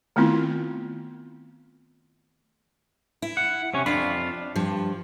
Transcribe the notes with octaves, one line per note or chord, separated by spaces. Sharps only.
D#3 A3 B3 C4 E4 F4
E4
F#5
C3 C#4 C#5
F2 D4 F4 B5
G2 F3